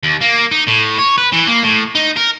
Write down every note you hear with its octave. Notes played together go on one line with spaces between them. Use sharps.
D#2
A#3
D#4
A2
C#5
B4
E3
A#3
A2
D#4
A#4